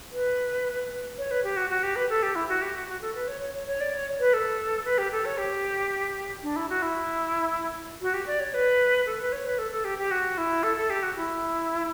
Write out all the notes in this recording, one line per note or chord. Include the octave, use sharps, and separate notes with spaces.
B4
C#5
B4
G4
F#4
F#4
G4
B4
A4
G4
E4
F#4
G4
F#4
F#4
A4
B4
C#5
C#5
C#5
C#5
D5
C#5
B4
A4
B4
G4
A4
C#5
G4
D4
E4
F#4
E4
F#4
G4
D5
C#5
B4
A4
B4
C#5
B4
A4
A4
G4
G4
F#4
E4
A4
A4
G4
F#4
E4